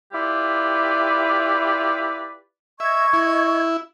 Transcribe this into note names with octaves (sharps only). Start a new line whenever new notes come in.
E4 F4 G4 B4 D5
D#5 E5 C#6 G#6
E4